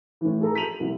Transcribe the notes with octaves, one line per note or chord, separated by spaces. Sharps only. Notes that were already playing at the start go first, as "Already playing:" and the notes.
A2 E3
G#4 A4 A#5
B6 D#7 F7 F#7
C2